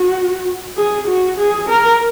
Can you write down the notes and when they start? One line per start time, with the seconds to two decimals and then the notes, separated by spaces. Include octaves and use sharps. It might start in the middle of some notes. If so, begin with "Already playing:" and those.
Already playing: F#4
0.77 G#4
1.08 F#4
1.38 G#4
1.69 A#4